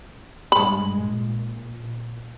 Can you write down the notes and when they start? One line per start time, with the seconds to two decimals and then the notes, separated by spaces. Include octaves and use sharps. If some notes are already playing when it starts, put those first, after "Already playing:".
0.52 G2 G#3 B5
1.02 A#2